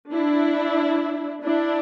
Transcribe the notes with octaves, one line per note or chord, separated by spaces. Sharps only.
D4 E4
D4 E4